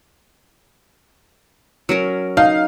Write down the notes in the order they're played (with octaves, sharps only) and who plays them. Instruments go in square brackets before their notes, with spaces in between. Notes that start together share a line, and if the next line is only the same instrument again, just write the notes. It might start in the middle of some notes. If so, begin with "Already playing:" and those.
[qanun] F#3 C#4 A#4
[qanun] D#4 [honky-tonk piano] F5